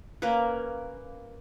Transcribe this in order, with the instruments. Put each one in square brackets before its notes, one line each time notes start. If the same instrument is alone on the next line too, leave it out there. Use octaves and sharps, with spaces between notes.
[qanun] A#3 C#4 A#4 B4